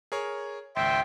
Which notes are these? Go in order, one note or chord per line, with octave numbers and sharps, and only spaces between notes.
G#4 A#4 C#5
G#1 C#2 E5 G5 C6